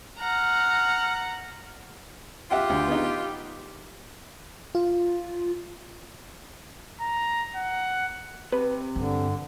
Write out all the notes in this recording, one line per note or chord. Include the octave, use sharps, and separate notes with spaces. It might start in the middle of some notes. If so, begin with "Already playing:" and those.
F#5 A#5 F6
F4 G4 E5 F#5 G5
D2
B3 D#4
F4
A#5
F#5
C3 B4
G2 D3